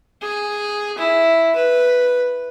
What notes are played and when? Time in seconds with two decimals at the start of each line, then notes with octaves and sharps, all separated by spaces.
0.22 G#4
0.98 E4
1.55 B4